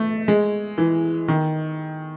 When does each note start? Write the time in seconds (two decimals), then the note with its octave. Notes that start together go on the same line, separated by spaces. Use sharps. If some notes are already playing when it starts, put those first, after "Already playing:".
Already playing: A3
0.28 G#3
0.78 E3
1.28 D#3